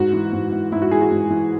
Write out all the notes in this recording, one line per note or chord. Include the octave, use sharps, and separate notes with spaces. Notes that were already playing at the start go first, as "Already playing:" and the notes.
Already playing: G#2 F#4
E3
G#2
E3
G#2 E4
F#4
E3 G#4
F#4
G#2
E3